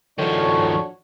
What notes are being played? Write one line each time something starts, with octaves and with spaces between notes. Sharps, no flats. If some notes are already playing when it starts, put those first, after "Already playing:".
A2 D#3 F3 D4 F#4 C#5